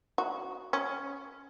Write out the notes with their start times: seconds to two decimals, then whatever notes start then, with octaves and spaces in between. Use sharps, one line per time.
0.18 F#4
0.73 C#4